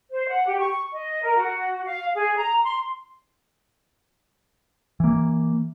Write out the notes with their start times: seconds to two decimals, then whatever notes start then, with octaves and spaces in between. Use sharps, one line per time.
0.11 C5
0.27 F#5
0.45 G4
0.59 C#6
0.93 D#5
1.23 A#4
1.37 F#4
1.86 F5
2.14 G#4
2.36 A#5
2.62 C6
5.00 E3 A#3